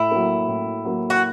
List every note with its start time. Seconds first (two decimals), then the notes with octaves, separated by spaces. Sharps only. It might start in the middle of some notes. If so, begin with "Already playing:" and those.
Already playing: A2 E4
0.11 F#3 A#3
0.48 A2
0.84 F#3 A#3
1.10 F#4